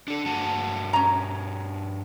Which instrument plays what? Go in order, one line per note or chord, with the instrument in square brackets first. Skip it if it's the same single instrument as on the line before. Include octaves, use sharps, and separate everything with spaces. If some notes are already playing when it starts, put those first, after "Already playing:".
[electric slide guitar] D4 A4
G2 F#4 A5
[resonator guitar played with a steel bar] C#4 A#5